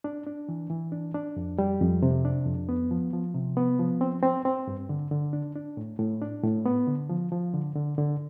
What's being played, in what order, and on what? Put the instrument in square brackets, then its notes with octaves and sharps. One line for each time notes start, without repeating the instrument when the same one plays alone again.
[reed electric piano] D4
D4
E3
E3
D4
D4
F2
G3
F2
C3
D4
F2
B3
F3
F3
C3
B3
F3
C4
C4
C4
G2
D3
D3
D4
D4
A2
A2
D4
A2
B3
D3
F3
F3
D3
D3
D3